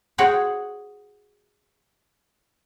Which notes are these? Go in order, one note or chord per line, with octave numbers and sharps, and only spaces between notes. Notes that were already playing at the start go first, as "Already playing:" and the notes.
F#4 G#4 C5 C#5 F#5 G5